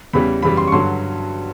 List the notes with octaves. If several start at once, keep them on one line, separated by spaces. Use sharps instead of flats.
E2 C#3 E3 G3 B5
F#2 C#3 E3 G3 B5
C6
C#6
G2 D3 F#3 C6